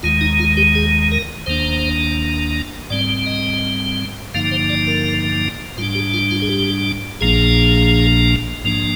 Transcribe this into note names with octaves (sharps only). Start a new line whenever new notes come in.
D#2 D#3 G#3 F4
D#4
F4
G4
G#4
A#4
D#2 D#3 A#3 D4 C5
G#2 G3 C4 D5
D#5
G2 D3 F3 A#3 D#4 F5
C5
D5
A#4
G#2 G3 D4 F4
G4
F4
F4
G#4
G4
A#1 A#2 F3 A#3 D4 G#4
G#2 F3 A#3 D4